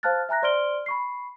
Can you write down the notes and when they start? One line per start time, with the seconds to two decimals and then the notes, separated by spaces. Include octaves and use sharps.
0.03 C5 F5 A5 F6 F#6 A6
0.29 E5 G#5 A#5 F#6 A#6
0.42 C5 D5 C6 F6 D7 G7
0.86 B5 C#6 C7